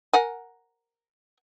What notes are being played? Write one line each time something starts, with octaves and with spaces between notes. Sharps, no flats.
A#4 F#5 G#5